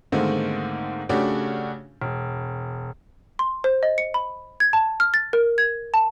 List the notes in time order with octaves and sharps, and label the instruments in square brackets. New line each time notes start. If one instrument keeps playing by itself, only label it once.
[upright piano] G#2 D3 D#3 A3 A#3 C4
C#3 A3 C#4 D4 F#4 G4
E1
[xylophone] C6
C5
D#5
C#7
B5
G#6
A5
F6
A6
A#4
G#6
A5